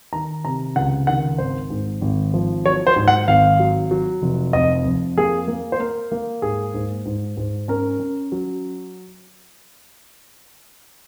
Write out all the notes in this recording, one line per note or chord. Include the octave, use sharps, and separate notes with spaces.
D#3 A#5
C3 A#5
C#2 F#5
D#3 F#5
G#1 C5
G#2
G#1
F3
F#3 C#5
C5
G#2
F#5
G#1 F5
F#3
F#3
F1
F2 D#5
F2
A#3 G#4
A#3
C5
A#3 A#4
A#3
G#2 G#4
G#2
G#2
G#2
C#4 A#4
C#4
F#3